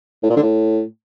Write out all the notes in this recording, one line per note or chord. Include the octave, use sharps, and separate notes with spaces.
A2
A#2
D3
A2